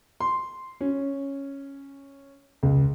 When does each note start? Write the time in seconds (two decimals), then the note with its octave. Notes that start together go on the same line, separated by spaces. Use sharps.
0.20 C6
0.81 C#4
2.63 C#2